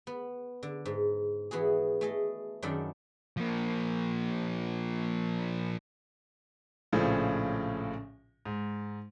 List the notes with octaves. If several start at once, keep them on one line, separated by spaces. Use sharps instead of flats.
B3
D3
G#2
E3 B3 F#4 G#4
A3 G#4 D#5
F#2 D#3 F#3 D4 A4 B5
F3 A#3
A#1 A2 C#3 F3
G#2